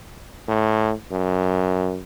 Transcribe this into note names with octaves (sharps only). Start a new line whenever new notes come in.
A2
F#2